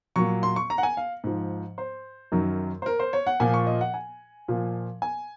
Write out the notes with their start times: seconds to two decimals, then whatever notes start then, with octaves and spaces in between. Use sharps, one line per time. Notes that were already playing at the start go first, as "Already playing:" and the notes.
0.16 A#2 F#3 C#6
0.43 C6
0.56 C#6
0.70 A#5
0.78 F#5
0.83 G#5
0.97 F5
1.24 G#2 F3
1.78 C5
2.32 F#2 D#3 F#3
2.82 C5
2.86 A#4
2.99 C5
3.13 C#5
3.27 F#5
3.40 A#2 F3 G#5
3.54 C#6
3.67 D#5
3.81 F#5
3.94 G#5
4.48 A#2 F3
5.02 G#5